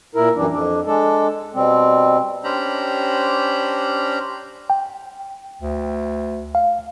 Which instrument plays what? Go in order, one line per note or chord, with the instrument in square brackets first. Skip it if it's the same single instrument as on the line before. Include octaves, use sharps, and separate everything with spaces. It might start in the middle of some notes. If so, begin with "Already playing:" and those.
[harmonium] A#2 E4 A#4
F#2 E3 G3 D4
F2 D4
G#3 D4 A4
B2 G3 C4
[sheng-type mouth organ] C#4 D4 G4 C5 A#5 B5
[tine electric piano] G5
[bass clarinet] D2
[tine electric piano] F5